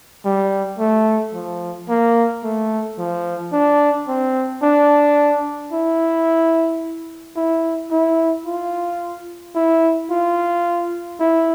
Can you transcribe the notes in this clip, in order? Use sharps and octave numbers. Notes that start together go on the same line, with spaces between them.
G3
A3
F3
A#3
A3
F3
D4
C4
D4
E4
E4
E4
F4
E4
F4
E4